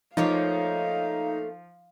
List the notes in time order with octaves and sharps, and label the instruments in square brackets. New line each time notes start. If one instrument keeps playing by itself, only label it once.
[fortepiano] F3 [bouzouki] A3 A#3 C#5 [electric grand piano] D#4 [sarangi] F5